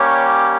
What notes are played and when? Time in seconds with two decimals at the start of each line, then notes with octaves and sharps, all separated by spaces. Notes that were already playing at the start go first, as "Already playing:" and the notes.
Already playing: G3 A#3 C#4 G4 C#5